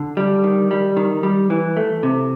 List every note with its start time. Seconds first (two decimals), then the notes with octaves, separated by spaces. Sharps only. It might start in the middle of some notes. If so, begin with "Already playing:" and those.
Already playing: D3
0.17 G3
0.44 D#3
0.71 G3
0.97 D#3
1.23 G3
1.50 E3
1.77 A3
2.03 C3